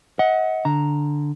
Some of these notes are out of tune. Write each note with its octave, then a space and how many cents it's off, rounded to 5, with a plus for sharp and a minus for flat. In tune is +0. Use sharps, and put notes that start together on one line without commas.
D#5 +40 F#5 +0
D3 +0 A#5 +0